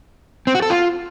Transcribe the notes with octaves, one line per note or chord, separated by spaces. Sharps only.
C4
F#4
A4
F4